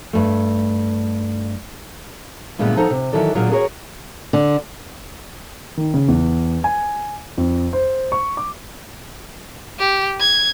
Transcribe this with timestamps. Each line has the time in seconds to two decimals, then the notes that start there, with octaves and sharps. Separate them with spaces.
0.13 G2 A3
2.59 G2 A#2 D3 G#3 A3 B3
2.77 F3 D#4 A4 F#5 A#5
2.90 C3
3.12 D#3 E3 F#3 A4 D5
3.35 A#2 D3 F#3 A#3 F4 G#4
3.51 F#4 G#4 A#4 C5 C#5
4.33 D3
5.77 D#3
5.94 C#3
6.08 E2
6.64 G#5
7.38 F2
7.73 C5
8.12 C#6
8.37 D6
9.79 G4
10.20 G#6